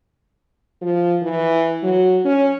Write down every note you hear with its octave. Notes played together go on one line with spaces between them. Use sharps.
F3
E3
F#3
C#4